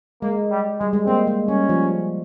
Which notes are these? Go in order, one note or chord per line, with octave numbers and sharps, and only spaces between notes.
G#3 A#3
G3
G3 G#3
G#3
A#3 C4
G#3
G3 C#4
F3